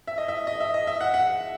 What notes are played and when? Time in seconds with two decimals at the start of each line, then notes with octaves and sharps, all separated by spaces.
0.07 E5
0.18 D#5
0.28 E5
0.47 D#5
0.60 E5
0.74 D#5
0.87 E5
1.01 F#5
1.14 F#5